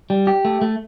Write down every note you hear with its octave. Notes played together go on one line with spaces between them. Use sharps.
G3
G4
A3
A3